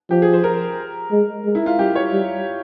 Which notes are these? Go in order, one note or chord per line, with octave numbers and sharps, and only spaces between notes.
F3 G4
G#4
C5
A#4
G#3
G#3
E4
F4
G3 G4
C#5
G3